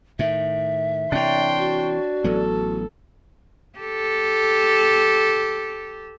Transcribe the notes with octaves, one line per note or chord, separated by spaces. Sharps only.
A2 D#3 E5
C3 E3 D4 C#5 G5 C6
F#4
A1 F#3 B3 A4
G4 A4